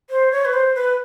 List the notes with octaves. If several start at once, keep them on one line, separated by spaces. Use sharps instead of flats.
C5
C#5
B4
C5
B4